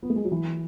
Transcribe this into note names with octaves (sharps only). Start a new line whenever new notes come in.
B3
A3
G#3
F#3
E3